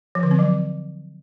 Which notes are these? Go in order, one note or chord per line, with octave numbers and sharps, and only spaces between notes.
F3
D3
C4
F#3